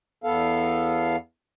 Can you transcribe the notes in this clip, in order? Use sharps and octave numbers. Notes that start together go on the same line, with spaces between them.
E2 B3 A4 F5